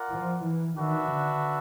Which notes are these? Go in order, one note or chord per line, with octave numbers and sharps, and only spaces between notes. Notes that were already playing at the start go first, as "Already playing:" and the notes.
Already playing: F4 A#4 D5 F#5
F3
E3
D#3 D4 F#4 B4 E5
D3